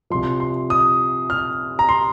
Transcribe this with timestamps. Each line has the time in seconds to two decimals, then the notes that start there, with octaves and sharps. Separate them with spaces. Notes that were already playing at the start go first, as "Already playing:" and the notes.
0.10 C2 C3 F3 C6
0.40 C6
0.70 D#6
1.30 F6
1.79 A#5
1.89 C6